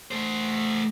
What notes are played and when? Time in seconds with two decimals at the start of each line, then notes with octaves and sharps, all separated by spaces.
0.11 A3 C5